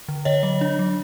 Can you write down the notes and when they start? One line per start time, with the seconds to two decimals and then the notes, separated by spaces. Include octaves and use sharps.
0.08 D3
0.25 D3 C#5 D#5
0.43 F#3
0.61 D4
0.79 F#3